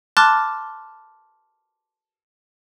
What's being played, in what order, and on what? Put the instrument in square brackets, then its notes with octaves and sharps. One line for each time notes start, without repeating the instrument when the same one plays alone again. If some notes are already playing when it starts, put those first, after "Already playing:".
[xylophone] A5 C6 D6 F6 F#6 A6